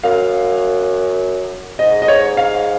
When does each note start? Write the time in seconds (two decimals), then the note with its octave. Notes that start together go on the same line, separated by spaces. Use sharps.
0.03 F#2 F5
1.79 G#2 D#5
2.02 D#5
2.08 C#5
2.37 F5